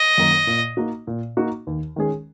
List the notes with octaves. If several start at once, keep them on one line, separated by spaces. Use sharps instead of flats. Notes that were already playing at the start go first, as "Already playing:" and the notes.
Already playing: D#5
F#2 D#3 A#3 D#4
A#2
A#3 D#4 F#4
A#2
A#3 D#4 F#4
D#2
D#3 G#3 C#4 G#4